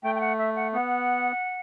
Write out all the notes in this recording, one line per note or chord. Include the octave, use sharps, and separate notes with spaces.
A3 G5
G5
F#5
E5
F#5
B3 F#5